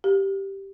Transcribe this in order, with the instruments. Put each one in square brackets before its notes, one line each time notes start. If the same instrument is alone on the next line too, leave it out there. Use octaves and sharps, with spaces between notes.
[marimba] G4